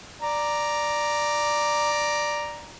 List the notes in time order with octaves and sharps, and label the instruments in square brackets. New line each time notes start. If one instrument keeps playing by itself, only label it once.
[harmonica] D5 A#5